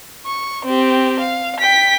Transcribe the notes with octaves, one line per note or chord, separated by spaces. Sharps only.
C#6
C4 G4
F5
G5 B6